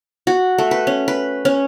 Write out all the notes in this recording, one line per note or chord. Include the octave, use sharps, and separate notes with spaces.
F#4
A3
B4
C#4
B4
C#4